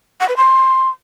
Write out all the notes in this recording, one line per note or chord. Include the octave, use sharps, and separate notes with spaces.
F#5
B4
C6